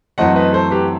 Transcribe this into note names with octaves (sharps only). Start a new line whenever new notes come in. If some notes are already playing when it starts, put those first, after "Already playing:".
F#2 E3 A3 C4 D#5 F#5
B4 D#5
A4 C5
G4 B4